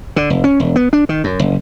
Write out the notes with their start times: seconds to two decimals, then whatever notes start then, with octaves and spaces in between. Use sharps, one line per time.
0.16 D3
0.30 F1
0.44 C#4
0.60 E1
0.76 B3
0.93 D4
1.09 D#3
1.24 F#2
1.39 F#1